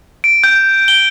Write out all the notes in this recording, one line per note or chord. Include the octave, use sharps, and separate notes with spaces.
D7
G6
G7